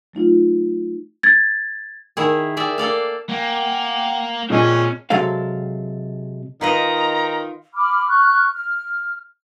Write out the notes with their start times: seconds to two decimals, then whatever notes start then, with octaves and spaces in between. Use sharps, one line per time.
0.13 F#3 A3 D#4 F4
1.23 G#6 A6
2.17 D#3 E4 G#4
2.57 G#4 D5 E5 G5
2.78 A#3 A4 D5 F5
3.29 A#3 F#5 G5
4.50 A#2 C4 C#4 G#4 D#5 A5
5.10 C3 F#3 G#3 A4 F5
6.61 D#3 F4 B4 D#5 A#5
7.75 B5 D6 F6
8.08 C#6 F6 F#6
8.52 F6